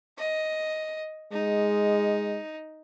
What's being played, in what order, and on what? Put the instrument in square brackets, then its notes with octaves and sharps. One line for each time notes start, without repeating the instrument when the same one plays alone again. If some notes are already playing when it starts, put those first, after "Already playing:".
[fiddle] D#5
[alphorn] G#3 [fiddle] D#4